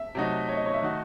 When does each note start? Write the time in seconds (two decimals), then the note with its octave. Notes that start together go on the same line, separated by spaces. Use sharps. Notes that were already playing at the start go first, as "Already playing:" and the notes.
Already playing: E5
0.15 C3 F#3 A3 D#4 F#4
0.49 C#5
0.57 D#5
0.66 C#5
0.74 E5
0.82 D#3 A3 D#4 F#4